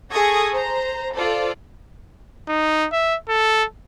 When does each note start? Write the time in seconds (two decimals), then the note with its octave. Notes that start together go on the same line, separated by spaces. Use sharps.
0.13 G#4 A4 C#6 D#6 G#6 A#6
0.52 C5 A#5
1.15 F4 A4 C5 D5
2.48 D#4
2.92 E5
3.29 A4